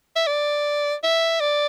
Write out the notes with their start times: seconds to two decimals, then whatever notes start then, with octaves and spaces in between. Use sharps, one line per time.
0.16 E5
0.27 D5
1.03 E5
1.40 D5